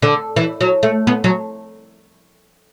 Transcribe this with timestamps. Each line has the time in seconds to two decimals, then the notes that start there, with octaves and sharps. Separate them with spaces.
0.02 D3
0.36 E3
0.61 F#3
0.83 A3
1.07 B3
1.24 F#3